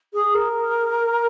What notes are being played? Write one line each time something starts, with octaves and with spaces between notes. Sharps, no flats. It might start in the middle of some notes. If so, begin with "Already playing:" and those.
G#4
A#4